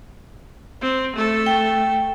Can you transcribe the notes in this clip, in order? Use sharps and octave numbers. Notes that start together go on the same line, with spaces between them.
C4
A3 A4
G5